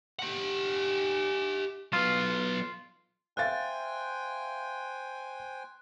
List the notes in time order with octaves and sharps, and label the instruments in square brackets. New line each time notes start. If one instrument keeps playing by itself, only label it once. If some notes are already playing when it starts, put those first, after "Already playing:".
[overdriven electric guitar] G4 F#5
[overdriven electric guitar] F#3 B3 [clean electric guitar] F4
[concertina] C5 G5 G#5 [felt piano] E5 F5 A6 [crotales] F#6